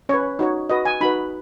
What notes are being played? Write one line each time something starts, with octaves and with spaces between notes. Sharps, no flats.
C#4 B4 C#5
D#4 F#4 C#5
F#4 B4 D#5
G#5
D#4 F#4 B4 B5